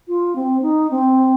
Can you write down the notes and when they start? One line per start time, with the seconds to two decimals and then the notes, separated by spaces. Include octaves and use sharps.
0.08 F4
0.36 C4
0.62 D#4
0.91 C4